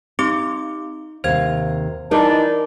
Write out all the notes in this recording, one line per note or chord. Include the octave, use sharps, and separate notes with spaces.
C4 D#4 G4 D6
D#2 C3 C5 G#6
E3 D4 D#4 A#4 D5 D#5 A5